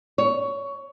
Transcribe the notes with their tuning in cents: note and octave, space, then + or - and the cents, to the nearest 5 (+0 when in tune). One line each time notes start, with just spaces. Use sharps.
C#5 +15